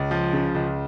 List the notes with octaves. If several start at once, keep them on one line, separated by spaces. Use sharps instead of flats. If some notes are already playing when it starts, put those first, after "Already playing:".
Already playing: C#2
F3
C#3
C#2